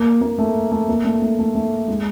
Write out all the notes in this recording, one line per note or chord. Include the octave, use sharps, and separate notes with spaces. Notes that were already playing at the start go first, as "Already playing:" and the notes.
Already playing: A#3
A#3
A3
A3
A#3
A3
A3
A3
A3
G#3